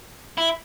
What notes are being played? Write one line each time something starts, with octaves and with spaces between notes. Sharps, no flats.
E4